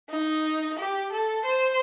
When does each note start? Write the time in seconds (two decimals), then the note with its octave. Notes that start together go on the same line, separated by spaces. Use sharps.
0.11 D#4
0.78 G4
1.12 A4
1.45 C5